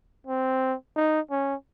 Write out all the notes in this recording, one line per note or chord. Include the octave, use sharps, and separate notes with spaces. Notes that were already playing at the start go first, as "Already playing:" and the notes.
C4
D#4
C#4